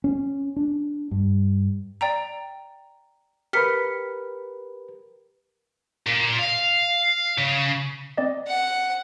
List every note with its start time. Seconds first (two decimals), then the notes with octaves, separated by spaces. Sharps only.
0.04 C#4
0.56 D4
1.11 G2
2.01 D5 G5 A#5
3.53 G4 A#4 B4 F6 B6 C#7
6.07 A#2
6.39 F5
7.38 C#3
8.17 C4 D5 D#5
8.47 F#5